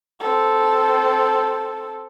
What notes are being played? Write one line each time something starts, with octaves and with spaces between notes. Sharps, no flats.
C4 A4